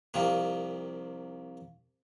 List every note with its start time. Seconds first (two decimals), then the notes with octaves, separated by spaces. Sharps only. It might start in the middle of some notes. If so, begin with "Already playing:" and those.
0.14 C2 C3 F3 A#3